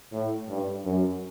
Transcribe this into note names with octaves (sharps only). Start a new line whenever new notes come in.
A2
G2
F#2